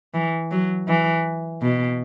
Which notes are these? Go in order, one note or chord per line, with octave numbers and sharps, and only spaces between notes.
E3
F#3
E3
B2